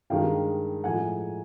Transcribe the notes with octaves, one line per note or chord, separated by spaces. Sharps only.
G2 D#3 G#3 F5 G5
A2 F3 G#3 F#5 G#5